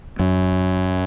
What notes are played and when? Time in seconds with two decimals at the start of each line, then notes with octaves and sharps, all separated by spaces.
0.19 F#2